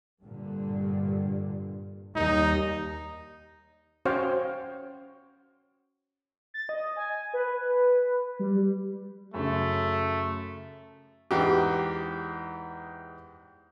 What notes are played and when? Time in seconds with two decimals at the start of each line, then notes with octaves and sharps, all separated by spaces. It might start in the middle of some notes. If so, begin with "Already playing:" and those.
0.22 G2 A#2 D3
2.16 D#2 G3 D#4
4.05 C#4 F#4 C5 C#5 F5 G5
6.54 A6
6.69 D#5
6.97 G#5
7.33 B4
8.39 G3
9.34 F#2 C#3 A3
11.31 E2 G#2 G4